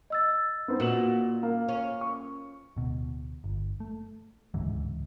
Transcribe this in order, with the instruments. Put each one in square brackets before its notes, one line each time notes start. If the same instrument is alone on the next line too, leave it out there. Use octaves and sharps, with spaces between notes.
[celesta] D#5 E6 A6
[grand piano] B3 C4 D#4
[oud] A#2 [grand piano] F#4 E7 F#7
[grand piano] A#3 F5
[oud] C#4
[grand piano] C#6
[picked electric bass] D1 B2
G1
A3
D1 C#2 G#2 E3